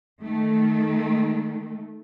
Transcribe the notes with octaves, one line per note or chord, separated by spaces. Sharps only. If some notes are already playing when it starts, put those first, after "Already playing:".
D#3 A3